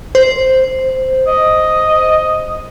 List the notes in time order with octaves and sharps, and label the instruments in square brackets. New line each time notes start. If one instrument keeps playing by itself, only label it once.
[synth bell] C5
[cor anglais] D#5